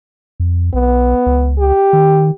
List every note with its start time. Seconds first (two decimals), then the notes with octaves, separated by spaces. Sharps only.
0.40 F2
0.74 B1 B3
1.26 C#2
1.59 G4
1.93 D#3